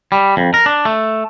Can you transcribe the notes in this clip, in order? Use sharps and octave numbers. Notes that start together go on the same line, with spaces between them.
G3
F2
A#4
D4
A3